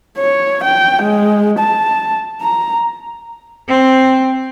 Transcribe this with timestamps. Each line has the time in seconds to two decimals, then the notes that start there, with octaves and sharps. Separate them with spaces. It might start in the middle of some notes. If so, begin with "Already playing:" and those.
0.18 C#5
0.64 G5
1.03 G#3
1.59 A5
2.42 A#5
3.69 C4